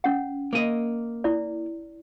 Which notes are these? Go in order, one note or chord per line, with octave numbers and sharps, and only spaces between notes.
C#4 F#5
A#3 D#5
E4 D5